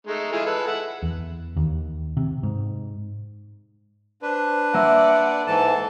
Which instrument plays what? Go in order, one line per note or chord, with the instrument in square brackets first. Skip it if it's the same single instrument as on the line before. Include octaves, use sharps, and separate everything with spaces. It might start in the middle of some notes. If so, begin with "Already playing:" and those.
[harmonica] G#3 A3 D#4
E4 F4 G#4
G#3 A4 B4
E5 F#5
[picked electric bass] E2
D#2
C3
G#2
[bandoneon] D4 B4 [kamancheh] C5
[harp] A#3 E5 C6 [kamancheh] D5 F#5
[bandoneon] G#2 E3 A5 [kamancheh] A4